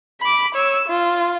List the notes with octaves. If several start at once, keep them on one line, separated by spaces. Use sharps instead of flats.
B5 D6
C#5 E6
F4